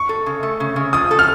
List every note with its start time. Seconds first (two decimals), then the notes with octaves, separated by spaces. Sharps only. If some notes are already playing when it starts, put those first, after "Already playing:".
Already playing: C#6
0.09 A4
0.26 C#3
0.43 A3
0.60 C#3
0.76 C#3
0.93 F3 D#6
1.11 A4
1.19 F6